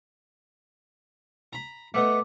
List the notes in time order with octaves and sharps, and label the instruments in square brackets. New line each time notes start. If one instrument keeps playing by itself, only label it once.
[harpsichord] A#5 B5
[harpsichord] A3 B3 D#5 [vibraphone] D6